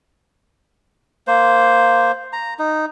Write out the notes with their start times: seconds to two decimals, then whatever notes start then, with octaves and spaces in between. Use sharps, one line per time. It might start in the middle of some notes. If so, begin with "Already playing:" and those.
1.27 A#3 C5
2.33 A#5
2.59 D#4